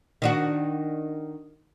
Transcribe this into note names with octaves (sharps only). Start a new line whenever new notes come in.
D#3 D4 F#4